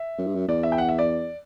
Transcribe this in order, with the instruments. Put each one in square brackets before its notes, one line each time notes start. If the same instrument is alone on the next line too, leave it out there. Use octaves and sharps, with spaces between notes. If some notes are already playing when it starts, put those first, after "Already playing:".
Already playing: [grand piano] E5
[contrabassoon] F#2
G2
F#2
[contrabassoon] E2 [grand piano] D5
[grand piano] E5
G5
F#5
E5
D5